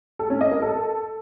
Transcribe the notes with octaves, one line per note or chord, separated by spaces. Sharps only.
A4
C#4
D#5
A#4
A4